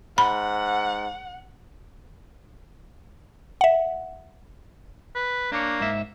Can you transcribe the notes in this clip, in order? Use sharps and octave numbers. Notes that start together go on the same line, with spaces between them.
G#2 F#5 B5
E5 F#5
B4
A#3 D4 C#5
G#2 E5